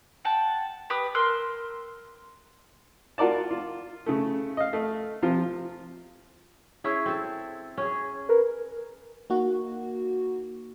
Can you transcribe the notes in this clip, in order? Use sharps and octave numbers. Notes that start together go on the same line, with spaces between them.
F#5 G5 A5
G4 B4 D#6
A#4 C6 E6 F#6
F4 F#4 A#4 D5 A5
F4
C#3 A3
D#5 F5
A3
C3 F3 F4
C#4 E4 G#4
C4 A4
C#4 G#4
A#4 B4
A#3 D#4 F#4